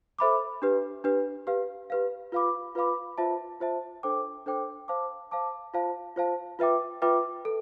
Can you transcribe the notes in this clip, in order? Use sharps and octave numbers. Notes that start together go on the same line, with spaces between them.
A4 C5 E5 B5 D6
D4 G4 B4
D4 G4 B4
G4 B4 F5
G4 B4 F5
F4 B4 F5 B5 D6
F4 B4 F5 B5 D6
F4 C5 E5 A5
F4 C5 E5 A5
D4 A4 C5 G5 D6
D4 A4 C5 G5 D6
C5 F5 A5 D6
C5 F5 A5 D6
F4 C5 F5 A5
F4 C5 F5 A5
F4 B4 E5 G5 D6
F4 B4 E5 G5 D6
A4